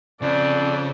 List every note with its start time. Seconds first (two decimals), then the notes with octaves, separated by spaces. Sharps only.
0.22 F2 C#3 D5